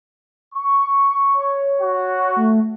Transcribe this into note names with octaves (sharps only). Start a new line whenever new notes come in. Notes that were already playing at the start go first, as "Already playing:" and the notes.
C#6
C#5
F#4
A3